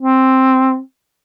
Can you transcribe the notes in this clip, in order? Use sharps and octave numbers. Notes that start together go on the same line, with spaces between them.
C4